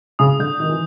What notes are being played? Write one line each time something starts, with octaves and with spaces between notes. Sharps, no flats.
C#3 D#6
D3 G6
D#3 G6
E3